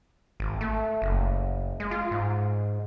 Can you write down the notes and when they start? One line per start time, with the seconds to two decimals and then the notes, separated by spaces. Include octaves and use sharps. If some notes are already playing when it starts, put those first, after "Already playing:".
0.40 G#1
0.61 A3
1.02 F#1
1.80 G#3
1.91 F4
2.11 G#2